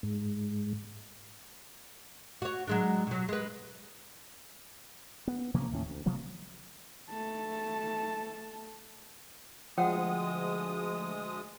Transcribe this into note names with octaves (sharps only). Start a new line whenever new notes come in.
G#2
F#4 C#5
F#3 G#3 D4
B2 F#3
G#3 B4
B3
C3 F3 A#3 C#4
D#2 A2 C#4
D2
C3 F3 F#3 A#3
A3 A5
D2 F3 G#3 F#5 G5 D#6